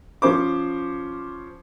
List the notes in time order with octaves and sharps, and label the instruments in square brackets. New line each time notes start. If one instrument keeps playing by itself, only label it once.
[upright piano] F3 C#4 C5 D6